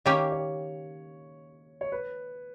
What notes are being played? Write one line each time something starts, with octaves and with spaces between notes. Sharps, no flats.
D#3 A#3 C#4 G4 C#5
C#5
C#5
B4